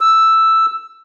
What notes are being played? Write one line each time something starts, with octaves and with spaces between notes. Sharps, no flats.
E6